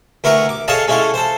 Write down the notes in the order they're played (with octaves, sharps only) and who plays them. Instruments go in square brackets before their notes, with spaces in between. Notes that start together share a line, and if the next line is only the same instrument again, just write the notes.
[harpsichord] D2 B3 E4 A#4 C#6
D6
G#4 A4 C#5 D#5 F5 A5
G#3 C#4 E4 F4 A4
A4 C5